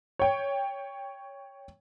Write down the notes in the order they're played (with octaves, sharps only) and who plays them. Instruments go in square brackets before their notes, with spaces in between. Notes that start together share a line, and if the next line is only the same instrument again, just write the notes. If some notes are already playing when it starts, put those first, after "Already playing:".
[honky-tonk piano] C#5 G5